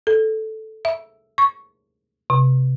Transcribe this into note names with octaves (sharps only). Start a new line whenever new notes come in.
A4
E5
C#6
C3